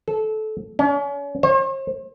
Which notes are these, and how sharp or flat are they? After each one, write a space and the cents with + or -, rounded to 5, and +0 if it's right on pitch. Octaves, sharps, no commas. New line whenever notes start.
A4 -20
C#4 +40
C5 +45